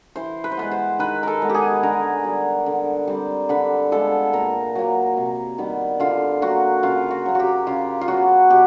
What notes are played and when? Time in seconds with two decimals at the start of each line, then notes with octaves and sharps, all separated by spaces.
0.16 E3 C5
0.44 B4
0.51 C5
0.57 G#3 B3 B4
0.71 C5
0.99 D#3 B4
1.23 A4 A#4
1.42 G#3 B3
1.49 G4
1.54 G#4
1.83 D3 A#4
2.24 G3 B3
2.66 D3
3.07 G3 C4
3.49 D3 B4
3.92 F3 G#3 B3 A4
4.33 A#2 A#4
4.75 F#3 A#3
5.17 C3
5.58 D#3 G3 B3
6.00 D3 F4
6.42 F#3 A#3 F#4
6.83 C#3 F4
7.11 F#4
7.26 F#3 A#3
7.35 F#4 G4
7.67 C#3 F4
8.01 F4
8.08 F#3 B3 F#4
8.50 B2 G4